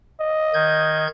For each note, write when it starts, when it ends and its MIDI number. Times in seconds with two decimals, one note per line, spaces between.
0.21 1.07 75
0.54 1.07 51
0.54 1.07 91
0.54 1.07 92